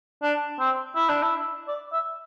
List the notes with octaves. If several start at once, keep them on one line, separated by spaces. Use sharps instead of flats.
D4
C4
E4
D4
E4
D5
E5